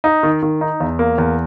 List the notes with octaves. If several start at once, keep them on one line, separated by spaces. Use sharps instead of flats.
D#4
D#3
D#3
D#4
E2
A#3
E2